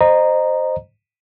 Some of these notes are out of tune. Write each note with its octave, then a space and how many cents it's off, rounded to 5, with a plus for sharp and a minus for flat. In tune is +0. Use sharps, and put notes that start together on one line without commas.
C5 +0 D#5 -20 A#5 +0